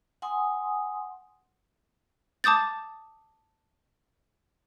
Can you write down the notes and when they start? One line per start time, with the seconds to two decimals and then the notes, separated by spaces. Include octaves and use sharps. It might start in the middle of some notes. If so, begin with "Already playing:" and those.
0.22 F#5 G#5 C6 D#6
2.44 A5 D6 D#6 G6 A6